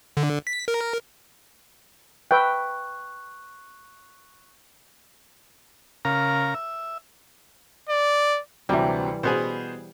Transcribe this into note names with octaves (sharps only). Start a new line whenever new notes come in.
D3
B6
A#4
B4 E5 G5 C#6 F#6
C#3 A#4 F5 A#5
E5
D5
D2 C3 E3 F#3 G3
B2 B3 G#4 C5